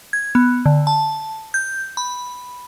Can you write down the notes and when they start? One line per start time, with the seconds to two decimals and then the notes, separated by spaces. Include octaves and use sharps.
0.13 G#6
0.35 B3
0.66 D3
0.87 A5
1.54 G6
1.97 B5